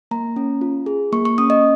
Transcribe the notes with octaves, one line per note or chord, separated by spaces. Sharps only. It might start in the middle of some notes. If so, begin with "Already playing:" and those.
A#3 A#5
C#4
F4
G#4
A#3 C#6
C#6
C#4 D#6
D#5